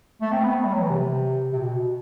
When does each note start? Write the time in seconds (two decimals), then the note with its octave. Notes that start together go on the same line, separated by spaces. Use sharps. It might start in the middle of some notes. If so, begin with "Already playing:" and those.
0.21 A3
0.32 C4
0.44 B3
0.56 A3
0.65 G3
0.73 F#3
0.82 E3
0.90 C3
1.53 C3
1.59 B2